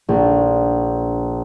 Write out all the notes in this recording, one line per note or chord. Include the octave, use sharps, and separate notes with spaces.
A#1